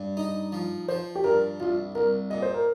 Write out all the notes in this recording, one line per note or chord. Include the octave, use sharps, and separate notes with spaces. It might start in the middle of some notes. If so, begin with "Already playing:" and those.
Already playing: G2
D#4 D#5
F3
F3 C5
G4
G2 A#4
C2 F4
C2 A#4
A#2 D#5
C5
A#4